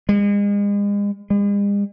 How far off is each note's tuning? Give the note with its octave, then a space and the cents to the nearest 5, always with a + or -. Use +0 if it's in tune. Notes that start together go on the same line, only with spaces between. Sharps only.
G#3 -40
G#3 -45